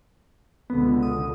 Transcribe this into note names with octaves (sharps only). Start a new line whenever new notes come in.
C#2 B2 D3 B3
D#6